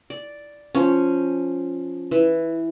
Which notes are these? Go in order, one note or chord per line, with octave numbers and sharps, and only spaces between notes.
D5
F3 C#4
E3